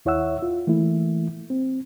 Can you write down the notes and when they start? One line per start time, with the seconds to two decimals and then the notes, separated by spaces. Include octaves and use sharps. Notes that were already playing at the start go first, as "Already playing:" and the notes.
0.05 D#2 E4 C#5 E5 F#5 E6
0.42 F4
0.67 E3 A3 A#3 E4
1.50 C4